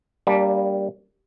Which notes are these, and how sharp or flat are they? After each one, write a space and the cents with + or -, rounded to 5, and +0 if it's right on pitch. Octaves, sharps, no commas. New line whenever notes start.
G3 +0 A#3 +0 D4 -30